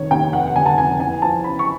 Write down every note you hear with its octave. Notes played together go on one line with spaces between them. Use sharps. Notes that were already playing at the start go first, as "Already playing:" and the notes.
Already playing: F1 D#3 C#5
D#2 G5
F1 F#5
D3 G#5
A5
F2 G#5
E2 G#5
F3 A5
C#3 B5
C#6